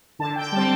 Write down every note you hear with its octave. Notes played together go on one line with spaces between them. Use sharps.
D3 A5
G5
G3 C4 A5